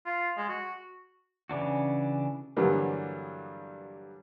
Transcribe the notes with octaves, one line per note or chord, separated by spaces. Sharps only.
F4
G#3
F#4
C#3 E3 D4 F#4
G2 D3 E3 F#3 G3 A#3